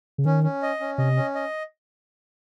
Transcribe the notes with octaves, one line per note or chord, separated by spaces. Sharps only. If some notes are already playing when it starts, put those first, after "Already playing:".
C#3
D#3 C#4
C#4
D#5
C#4
C3 D#5
C#4
D#5